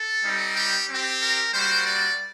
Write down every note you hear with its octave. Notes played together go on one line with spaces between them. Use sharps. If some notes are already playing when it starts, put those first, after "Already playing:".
Already playing: A4
G3 C4 D#4
G4
C4 G4
A#4
G3 A#3 F#4 C5
D5